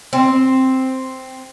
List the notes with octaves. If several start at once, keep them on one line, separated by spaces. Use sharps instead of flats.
C4